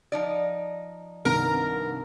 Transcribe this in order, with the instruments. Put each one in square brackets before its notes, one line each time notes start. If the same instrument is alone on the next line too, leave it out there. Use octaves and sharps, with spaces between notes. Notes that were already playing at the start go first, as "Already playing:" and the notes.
[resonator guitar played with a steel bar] F3 D#4 D5
[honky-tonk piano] C2 G2 D#3 [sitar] A#4